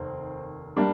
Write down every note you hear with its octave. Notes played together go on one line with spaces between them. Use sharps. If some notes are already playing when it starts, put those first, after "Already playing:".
Already playing: F1 D#2 D#3 C4
G3 A#3 D4